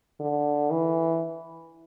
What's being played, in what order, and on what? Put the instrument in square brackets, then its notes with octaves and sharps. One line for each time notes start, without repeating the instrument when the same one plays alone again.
[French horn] D3
E3